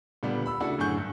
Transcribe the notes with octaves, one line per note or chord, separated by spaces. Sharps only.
A#2 D3 G3 B3 D4
B5 E6
C#3 A3 D4 E4 F#4 A4
F#2 A2 D3 G#4 C#6 G6
G2